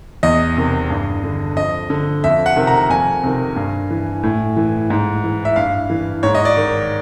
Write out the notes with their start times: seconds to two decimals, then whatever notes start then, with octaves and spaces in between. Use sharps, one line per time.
0.23 E2 D#5
0.57 C3 D#3
0.90 G2
1.24 D3
1.56 F2 D#5
1.90 D3
2.24 F2 E5
2.46 F#5
2.56 C3 D#3
2.67 A#5
2.90 F2 G#5
3.23 C3 D#3
3.56 G2
3.91 E3
4.23 A2
4.57 E3
4.90 G#2
5.24 E3
5.45 E5
5.56 G2 F5
5.90 E3
6.23 G#2 C#5
6.35 D#5
6.45 D5
6.57 D#3